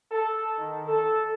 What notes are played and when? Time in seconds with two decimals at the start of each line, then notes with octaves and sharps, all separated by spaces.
0.11 A4
0.58 D#3
0.87 A4